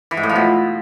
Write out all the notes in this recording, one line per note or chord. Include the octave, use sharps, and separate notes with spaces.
E3
G#2
A2
F3
B2